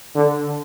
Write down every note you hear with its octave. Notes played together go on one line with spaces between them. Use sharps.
D3